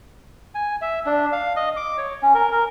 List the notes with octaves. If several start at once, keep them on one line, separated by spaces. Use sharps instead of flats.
G#5
E5
D4
F5
D#5
D6
C#5
C#4
A#4
A#4